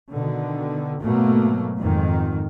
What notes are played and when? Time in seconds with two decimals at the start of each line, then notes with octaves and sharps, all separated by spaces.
0.11 B2 D3 D#3
1.00 G#2 B2 F#3 A3 A#3
1.77 F2 G#2 D#3